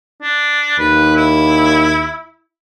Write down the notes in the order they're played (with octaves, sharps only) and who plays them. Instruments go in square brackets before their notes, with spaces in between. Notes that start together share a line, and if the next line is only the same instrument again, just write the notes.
[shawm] D4
[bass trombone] D#2 [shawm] B4
[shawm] E4